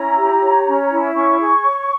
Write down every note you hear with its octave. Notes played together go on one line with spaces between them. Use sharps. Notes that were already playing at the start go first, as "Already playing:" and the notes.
Already playing: C#4 E4 A#5
G4
C#5
C#4
E4
C#4 C#6
G#4
C#5